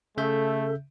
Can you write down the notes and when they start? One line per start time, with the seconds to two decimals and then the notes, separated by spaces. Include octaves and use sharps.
0.18 C#3 A3 A4 E5 G6